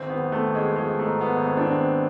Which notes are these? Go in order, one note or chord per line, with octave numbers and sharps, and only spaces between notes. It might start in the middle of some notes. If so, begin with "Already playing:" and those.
Already playing: G#1 C4
B3
G#1
A3
G#1
G#3
F3 G#3
A3
G#2
B3
G#1
C4
D4
G#1
C4